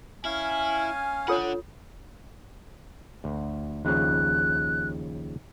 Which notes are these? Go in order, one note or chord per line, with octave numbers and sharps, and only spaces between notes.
C#4 E4 F5 G#5
D4 F4 A4 C#5 F#5
D2
D#2 C#3 F3 F#6